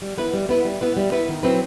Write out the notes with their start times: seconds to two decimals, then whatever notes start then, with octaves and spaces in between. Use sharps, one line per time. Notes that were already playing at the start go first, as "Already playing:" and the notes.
0.02 G3
0.18 B3 E4 B4
0.34 G3
0.49 B3 E4 B4
0.65 G3
0.81 B3 E4 B4
0.97 G3
1.12 B3 E4 B4
1.29 D#3
1.43 F#3 C4 E4 B4